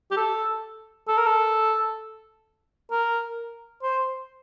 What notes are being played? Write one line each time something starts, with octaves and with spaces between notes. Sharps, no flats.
G4
A4
A4
A#4
A4
A#4
C5